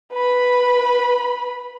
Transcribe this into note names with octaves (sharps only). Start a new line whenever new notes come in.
B4 B5